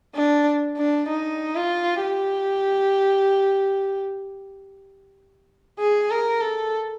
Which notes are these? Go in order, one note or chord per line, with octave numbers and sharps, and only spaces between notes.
D4
D4
D#4
F4
G4
G#4
A#4
A4